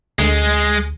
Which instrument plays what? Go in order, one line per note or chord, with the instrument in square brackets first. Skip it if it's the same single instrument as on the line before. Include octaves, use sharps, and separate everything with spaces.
[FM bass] D2 [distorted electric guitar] G#3